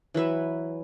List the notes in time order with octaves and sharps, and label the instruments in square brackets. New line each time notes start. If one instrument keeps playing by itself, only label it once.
[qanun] E3 F#3 B4 E5